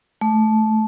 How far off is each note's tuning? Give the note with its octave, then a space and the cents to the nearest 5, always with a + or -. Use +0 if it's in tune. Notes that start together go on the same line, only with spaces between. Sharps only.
A3 -15